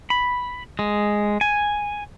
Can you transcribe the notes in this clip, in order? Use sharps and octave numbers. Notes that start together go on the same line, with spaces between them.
B5
G#3
G#5